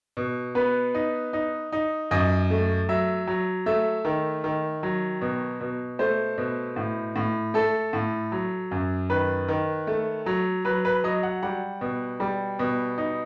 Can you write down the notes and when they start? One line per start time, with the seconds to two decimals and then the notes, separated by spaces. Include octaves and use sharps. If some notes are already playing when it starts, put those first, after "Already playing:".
0.17 B2
0.55 B3 B4
0.95 D#4
1.33 D#4
1.72 D#4
2.11 F#2 D#5
2.50 A3
2.89 F#3 E5
3.27 F#3
3.66 A3 E5
4.05 D#3
4.44 D#3
4.83 F#3
5.21 B2
5.60 B2
5.99 A3 C5
6.38 B2
6.76 A2
7.16 A2
7.54 A3 A4
7.93 A2
8.32 F#3
8.71 F#2
9.10 D#3 B4
9.48 D#3
9.87 A3
10.26 F#3
10.65 F#3 B4
10.85 B4
11.04 F#3 D#5
11.23 F#5
11.43 G3 F#5
11.81 B2
12.20 G3
12.59 B2
12.98 D#4